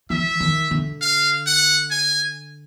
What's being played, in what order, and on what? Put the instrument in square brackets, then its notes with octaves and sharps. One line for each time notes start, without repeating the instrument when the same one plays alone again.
[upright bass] E3 [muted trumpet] E5
[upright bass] D#3
D3
[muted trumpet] F5
F#5
G#5